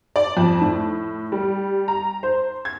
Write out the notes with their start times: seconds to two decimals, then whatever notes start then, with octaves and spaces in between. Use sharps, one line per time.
0.16 D5
0.37 F2
0.61 A2
1.32 G3
1.88 A#5
2.23 C5
2.65 G#6